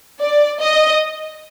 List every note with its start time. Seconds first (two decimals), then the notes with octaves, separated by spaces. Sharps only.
0.21 D5
0.61 D#5